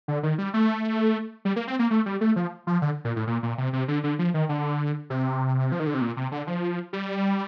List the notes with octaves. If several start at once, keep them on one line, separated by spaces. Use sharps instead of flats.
D3
D#3
G3
A3
G3
A#3
C4
A#3
A3
G3
A3
F3
F3
D3
A#2
A2
A#2
A#2
C3
C3
D3
D3
F3
D#3
D3
C3
F3
D#3
D3
C3
A#2
C3
D3
F3
G3